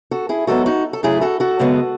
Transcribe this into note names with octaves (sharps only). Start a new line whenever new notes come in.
F#4 A4
E4 G#4
G#2 F#3 B3 F#4 A4
D#4 F#4
A4
C#3 F#3 A3 E4 G#4
F#4 A4
F#4 A4
F#2 C#3 G#3 B3